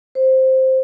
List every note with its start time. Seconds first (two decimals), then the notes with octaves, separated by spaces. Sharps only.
0.15 C5